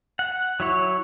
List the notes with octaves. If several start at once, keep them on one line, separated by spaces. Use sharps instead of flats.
F#5
F#3 E4 C#5